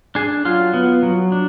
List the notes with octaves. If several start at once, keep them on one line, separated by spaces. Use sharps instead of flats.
D4 G#4
F#3 F4
B3
F#3
D4